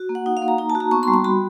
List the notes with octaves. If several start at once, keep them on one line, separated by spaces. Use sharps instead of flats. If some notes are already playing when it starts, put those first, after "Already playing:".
Already playing: F#4
A#3
F#5
D#4 F#5
F5
A#3
A#5
D#4 A#5
A5
F#4
A#5
B3 C#6
C6
G3
C6
F#4 B5